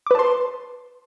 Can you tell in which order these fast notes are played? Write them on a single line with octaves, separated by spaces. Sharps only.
D6 B4 A5 C6